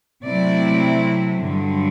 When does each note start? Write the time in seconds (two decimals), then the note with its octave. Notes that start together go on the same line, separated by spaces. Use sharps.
0.24 C3 F#3 A3 C4 E4 D5
1.41 G2 D3 F#3